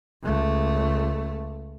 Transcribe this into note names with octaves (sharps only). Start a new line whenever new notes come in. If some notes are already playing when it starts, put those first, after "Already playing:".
C#2 A3